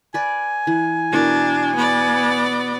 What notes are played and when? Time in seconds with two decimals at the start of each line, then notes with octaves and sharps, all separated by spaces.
0.14 B4 D5 G#5
0.67 E3
1.12 B2 E3 D4 A#4
1.75 B3 D5